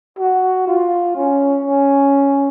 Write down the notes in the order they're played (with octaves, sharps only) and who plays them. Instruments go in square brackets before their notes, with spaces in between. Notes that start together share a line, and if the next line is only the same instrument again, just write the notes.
[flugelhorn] F#4
F4
C#4
C#4